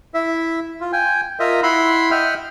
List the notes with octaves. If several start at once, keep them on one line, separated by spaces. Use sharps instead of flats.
E4 E5
F4
G5 G#5
F4 A#4 D#5 E5 A#5
E4 E5 F#5 B5 C6
D#5 E5 F#5 G5 F6